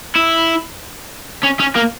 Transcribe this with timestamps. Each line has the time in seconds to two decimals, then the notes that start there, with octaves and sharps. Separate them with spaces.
0.16 E4
1.43 C#4
1.60 C#4
1.75 A#3